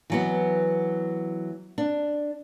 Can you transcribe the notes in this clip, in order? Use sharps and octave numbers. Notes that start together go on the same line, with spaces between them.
E3 F#3 B3
D4